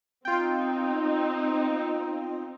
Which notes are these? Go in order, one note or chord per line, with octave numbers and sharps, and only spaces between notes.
C4 D#4 F4 G5